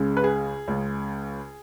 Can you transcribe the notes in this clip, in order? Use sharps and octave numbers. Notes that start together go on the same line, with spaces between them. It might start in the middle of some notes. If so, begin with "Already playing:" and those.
Already playing: C#2 C#3 G#3
B4
G#4
C#2 C#3 G#3